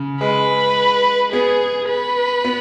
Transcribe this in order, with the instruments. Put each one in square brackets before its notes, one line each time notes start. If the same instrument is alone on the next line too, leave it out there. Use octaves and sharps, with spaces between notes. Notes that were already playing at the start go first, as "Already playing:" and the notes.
Already playing: [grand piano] C#3
[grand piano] G#3 [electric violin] B4
[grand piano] B3 [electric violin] G#4
[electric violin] B4
[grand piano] B3